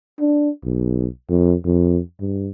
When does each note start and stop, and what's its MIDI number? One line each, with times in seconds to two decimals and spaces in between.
0.20 0.50 62
0.64 1.06 35
1.29 1.55 41
1.65 2.00 41
2.20 2.51 43